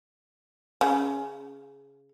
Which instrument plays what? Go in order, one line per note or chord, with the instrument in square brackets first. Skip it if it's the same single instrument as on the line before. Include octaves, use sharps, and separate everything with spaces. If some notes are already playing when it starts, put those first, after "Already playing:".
[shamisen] C#3